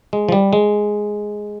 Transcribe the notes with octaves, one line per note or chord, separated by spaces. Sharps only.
G#3
F3
G3
G#3